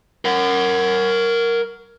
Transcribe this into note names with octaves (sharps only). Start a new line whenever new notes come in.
A#4 F#5